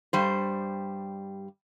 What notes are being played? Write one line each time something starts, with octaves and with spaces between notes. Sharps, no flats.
G2 G3 C5